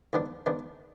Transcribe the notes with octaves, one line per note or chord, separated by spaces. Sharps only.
G#2 D#3 B3 D4
G#2 D#3 B3 D4